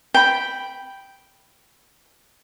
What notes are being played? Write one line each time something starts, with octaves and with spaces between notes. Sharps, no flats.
G5 B5